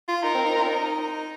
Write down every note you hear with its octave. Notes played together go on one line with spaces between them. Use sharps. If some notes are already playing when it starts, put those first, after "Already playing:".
F4
D#4 A#4
C4
D#4
F4
C4
D#4